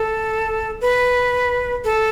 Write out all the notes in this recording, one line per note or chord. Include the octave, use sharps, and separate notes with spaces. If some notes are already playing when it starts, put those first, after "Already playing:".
Already playing: A4
B4
A4